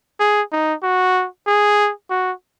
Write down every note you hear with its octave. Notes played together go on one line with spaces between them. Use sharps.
G#4
D#4
F#4
G#4
F#4